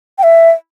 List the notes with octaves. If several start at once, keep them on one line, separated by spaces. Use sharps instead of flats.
G5
E5